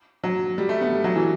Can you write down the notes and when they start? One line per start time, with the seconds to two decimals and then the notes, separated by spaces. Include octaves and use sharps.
0.23 F#3
0.58 G3
0.69 A3
0.81 B3
0.92 G3
1.04 F#3
1.16 E3